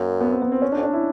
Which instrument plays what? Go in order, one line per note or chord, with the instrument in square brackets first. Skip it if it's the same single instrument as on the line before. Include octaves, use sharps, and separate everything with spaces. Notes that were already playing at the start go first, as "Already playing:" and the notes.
Already playing: [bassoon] F#2 [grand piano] A#3
[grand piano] B3
C4
B3
C4
C#4
D4
[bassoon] F2
[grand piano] D4
E4